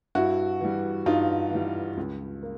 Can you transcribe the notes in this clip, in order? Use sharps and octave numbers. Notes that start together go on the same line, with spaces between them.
G2 E4 F#4
E3 G3
G2 D#4 F4
E3 G3
C#2
A#3